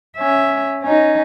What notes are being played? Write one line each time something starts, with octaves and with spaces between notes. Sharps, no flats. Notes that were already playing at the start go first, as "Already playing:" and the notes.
C#4 E5
C#4 D#4